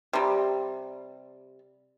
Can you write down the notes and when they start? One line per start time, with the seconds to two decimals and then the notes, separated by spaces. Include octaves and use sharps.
0.13 C3 G3